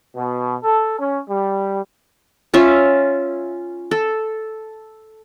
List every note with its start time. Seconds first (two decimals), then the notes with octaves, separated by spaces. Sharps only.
0.15 B2
0.63 A4
0.99 C#4
1.29 G3
2.54 C#4 F4 C#5 E5
3.91 A4